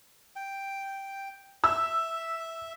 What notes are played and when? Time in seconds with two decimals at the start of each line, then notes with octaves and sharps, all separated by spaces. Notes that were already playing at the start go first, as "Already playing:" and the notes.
0.36 G5
1.64 E5 E6